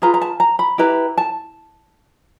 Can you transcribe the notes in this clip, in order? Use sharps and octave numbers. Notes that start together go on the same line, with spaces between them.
F4 G#4 B4 A#5
A#5
A5
A#5
B5
E4 G4 B4 A#5
A5